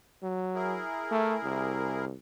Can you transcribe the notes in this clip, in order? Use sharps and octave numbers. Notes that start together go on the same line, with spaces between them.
F#3
E4 G#4 A#4
A3
C2